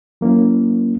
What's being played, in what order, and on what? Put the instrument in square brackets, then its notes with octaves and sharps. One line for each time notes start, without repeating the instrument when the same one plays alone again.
[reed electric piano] F#3 A#3 C#4 E4